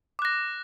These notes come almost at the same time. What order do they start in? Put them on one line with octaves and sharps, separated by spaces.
D6 F#6 A#6